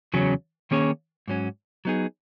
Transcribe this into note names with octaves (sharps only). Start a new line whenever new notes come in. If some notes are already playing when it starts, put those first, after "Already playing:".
E2 C#3 F#3 C#4
D#3 A#3 C#4 G#4 C#5
G#2 F#3 C#4
F#3 B3 D#4 G#4